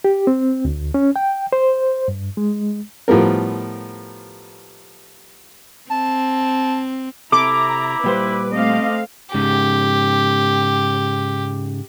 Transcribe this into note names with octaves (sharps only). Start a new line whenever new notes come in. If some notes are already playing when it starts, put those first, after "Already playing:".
G4
C4
D2
C#4
G5
C5
G2
G#3
A2 F3 G3 B3 A#4
C4 A5
C3 E4 A4 A#5 D6
A#2 G3 B4 C5
A3 C4 D#5 F5
G#2 C#3 G4